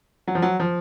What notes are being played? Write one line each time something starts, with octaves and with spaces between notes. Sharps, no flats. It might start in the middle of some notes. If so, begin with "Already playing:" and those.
F#3
F3
F#3
F3